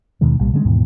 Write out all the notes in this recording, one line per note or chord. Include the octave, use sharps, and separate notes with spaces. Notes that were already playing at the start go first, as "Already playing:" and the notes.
D#2 B2 D#3 G#3
B1 A#2 G3
D3 G3 G#3 C#4
D#2 G#2 B2 E3